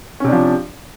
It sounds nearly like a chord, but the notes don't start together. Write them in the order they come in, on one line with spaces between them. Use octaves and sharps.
C#4 C3 D4 F3